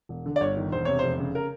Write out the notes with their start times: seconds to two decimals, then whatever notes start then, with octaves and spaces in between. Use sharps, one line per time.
0.09 E1
0.26 D3
0.36 D5
0.41 G1 C#5
0.57 D#3
0.72 E1 C5
0.85 C3 C#5
0.99 F1 C5
1.19 C#3
1.35 A#4